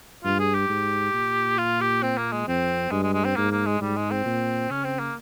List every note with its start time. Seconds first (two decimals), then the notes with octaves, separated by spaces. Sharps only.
0.24 G2 F4
0.40 G#4
0.54 G4
0.69 G#2
1.14 A#2
1.58 F4
1.81 G4
2.03 C4
2.17 A#3
2.32 G#3
2.48 F2 C4
2.91 G2 G#3
3.03 G#3
3.14 G#3
3.25 C4
3.37 G#2 A#3
3.52 A#3
3.66 G#3
3.81 G#2 G3
3.97 G#3
4.11 C4
4.26 A#2
4.70 C#3 C#4
4.85 C4
5.00 A#3